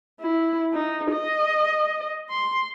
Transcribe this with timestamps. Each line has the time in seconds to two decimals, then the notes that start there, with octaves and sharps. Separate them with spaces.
0.20 E4
0.73 D#4
1.12 D#5
2.30 C6